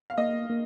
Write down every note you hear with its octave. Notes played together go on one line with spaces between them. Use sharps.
F5
A#3 D#5
A#3